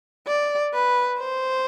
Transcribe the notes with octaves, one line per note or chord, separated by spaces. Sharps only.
D5
B4
C5